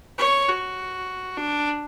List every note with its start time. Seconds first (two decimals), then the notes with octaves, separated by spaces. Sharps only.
0.18 C#5
0.48 F#4
1.37 D4